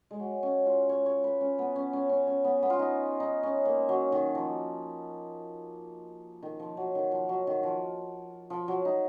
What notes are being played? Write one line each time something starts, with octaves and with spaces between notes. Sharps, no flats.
G#3
F#3
C#4
F4
C#5
C#5
B4
C#4
B3
C#4
C#4
C#4
C#4
B3
B3
F4
D#4
D#4
C#4
A#3
F#3
D#3
F3
D#3
F3
F#3
D#3
F3
F#3
D#3
F3
F3
F#3
D#4